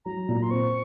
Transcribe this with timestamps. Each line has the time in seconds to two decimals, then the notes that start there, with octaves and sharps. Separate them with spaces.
0.05 F#3 A#5
0.28 A#2
0.34 A#5
0.42 C6
0.50 C4 C#6